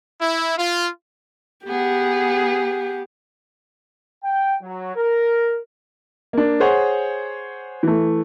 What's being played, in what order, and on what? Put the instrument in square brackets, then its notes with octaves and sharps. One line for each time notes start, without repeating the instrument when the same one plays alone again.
[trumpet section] E4
F4
[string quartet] B3 G#4 F#5 [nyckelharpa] G4
[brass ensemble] G5
F#3
A#4
[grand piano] A#3 D4
G#4 C5 C#5 F#5 G#5
E3 A3